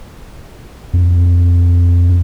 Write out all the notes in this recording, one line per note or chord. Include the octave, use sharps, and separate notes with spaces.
F2